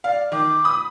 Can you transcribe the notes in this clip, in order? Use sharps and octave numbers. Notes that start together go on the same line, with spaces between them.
D5 F5
D#3 D6
B5 D#6